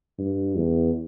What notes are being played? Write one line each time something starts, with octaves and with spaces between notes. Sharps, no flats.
G2
E2